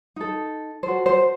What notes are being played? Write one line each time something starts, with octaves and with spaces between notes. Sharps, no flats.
D#4 A4
F#4 A4 C5
C5